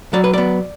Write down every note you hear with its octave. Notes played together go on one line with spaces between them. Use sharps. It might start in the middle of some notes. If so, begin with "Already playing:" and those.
F#3 D5
B4
B3 D5